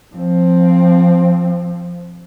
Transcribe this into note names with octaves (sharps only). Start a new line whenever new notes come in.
F3 C4